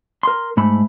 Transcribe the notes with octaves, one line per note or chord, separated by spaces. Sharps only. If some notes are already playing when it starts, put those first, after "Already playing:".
A#4 C6
G#2 A3 B5